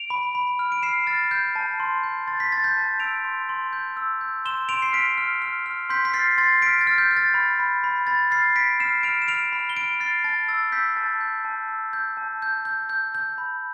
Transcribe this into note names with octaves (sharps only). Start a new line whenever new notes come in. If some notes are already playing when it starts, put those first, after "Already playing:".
Already playing: D7 F7
B5
B5
F6
D7
F6 C7 E7
F6 A6
F6 G6
A5
C6
G6
C6 A6
B6
C6 A6
G6 B6
A5
E6 D7 F7
C6
C6
G6
E6
G6
C6 E7 G7
C6 D7 F7
C7
F6 B6 D7
F6
F6
F6
C6 G6 B6
B6
F6 A6 C7
C6 A6 C7
F6 B6 D7
A6
F6
G6
F6
A6
B5
B5
B5
B5 A6
F6 A6 C7
B5 B6 D7
F6 C7 E7
F6 D7 F7
E7
F6 D7 F7
B5
G7
F6 D7 F7
F6 A6 C7
A5 A6
E6 A6
E6 G6 B6
A5 A6
G6
A5
E6
G6
A5
G6
G6
G6
G6
B5